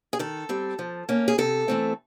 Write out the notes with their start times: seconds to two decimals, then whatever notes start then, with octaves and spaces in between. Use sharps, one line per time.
0.13 G#4
0.19 D#3 A4
0.49 G3 C4
0.79 F3
1.09 A#3 C#4
1.28 G#4
1.38 C3 A4
1.68 E3 A3 C4